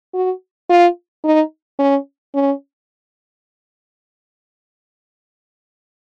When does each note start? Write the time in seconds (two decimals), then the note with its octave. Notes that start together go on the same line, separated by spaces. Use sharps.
0.14 F#4
0.69 F4
1.24 D#4
1.79 C#4
2.35 C#4